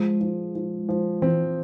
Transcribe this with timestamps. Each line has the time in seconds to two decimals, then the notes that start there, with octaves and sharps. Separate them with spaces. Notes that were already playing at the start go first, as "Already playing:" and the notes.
Already playing: F3 G#3
0.21 F3
0.55 F3
0.89 F3
1.22 E3 C4